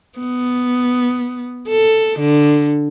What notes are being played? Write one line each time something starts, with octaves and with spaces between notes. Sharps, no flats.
B3
A4
D3